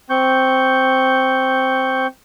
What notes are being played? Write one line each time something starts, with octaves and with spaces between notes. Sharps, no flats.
C4 C#6 G6